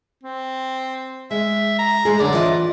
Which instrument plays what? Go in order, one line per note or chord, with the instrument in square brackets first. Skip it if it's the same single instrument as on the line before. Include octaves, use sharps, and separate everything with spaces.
[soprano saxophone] C4
[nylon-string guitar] G#3 [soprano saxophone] E5
[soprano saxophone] A#5
[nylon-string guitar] G#3 G#4
[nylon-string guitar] F#2 D3 [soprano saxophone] D5
[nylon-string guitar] E3 F4 D#5